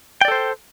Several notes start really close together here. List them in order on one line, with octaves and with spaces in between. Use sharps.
G5 D5 A4 C5